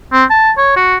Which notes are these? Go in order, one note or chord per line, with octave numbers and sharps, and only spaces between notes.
C4
A5
C#5
F#4